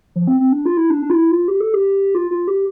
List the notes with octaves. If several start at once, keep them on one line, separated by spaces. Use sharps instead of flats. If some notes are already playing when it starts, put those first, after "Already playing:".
F3
C4
C4
D4
F4
E4
D4
D4
F4
E4
F4
G4
A4
G4
F4
F4
G4